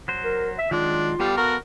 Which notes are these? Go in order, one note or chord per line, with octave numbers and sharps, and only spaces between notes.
F#3 C5
A#4
E5
D#3 F#3 G#3 D4 F4
G3 B3 G4 A4 F5
F#4 A#4